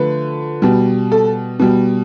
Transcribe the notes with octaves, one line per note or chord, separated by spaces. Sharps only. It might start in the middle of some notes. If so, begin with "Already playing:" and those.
Already playing: D3 F3 A3 B4
B2 G3
A4
B2 G3